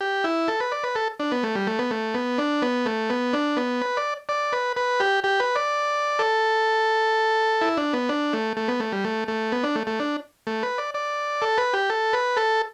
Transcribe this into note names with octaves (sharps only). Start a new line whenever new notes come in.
G4
E4
A4
B4
D5
B4
A4
D4
B3
A3
G3
A3
B3
A3
B3
D4
B3
A3
B3
D4
B3
B4
D5
D5
B4
B4
G4
G4
B4
D5
A4
E4
D4
B3
D4
A3
A3
B3
A3
G3
A3
A3
B3
D4
A3
A3
D4
A3
B4
D5
D5
A4
B4
G4
A4
B4
A4